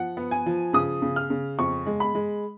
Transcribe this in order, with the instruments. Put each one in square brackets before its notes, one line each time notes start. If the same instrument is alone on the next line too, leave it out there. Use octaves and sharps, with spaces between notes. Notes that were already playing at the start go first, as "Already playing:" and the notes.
Already playing: [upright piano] F3 F#5
B3
G#5
F3
C#3 D#6
C#3
F6
C#3
F2 C#6
G#3
B5
G#3